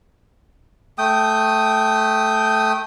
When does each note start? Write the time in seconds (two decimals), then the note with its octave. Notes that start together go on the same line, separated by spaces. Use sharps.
0.98 A3 G5 D#6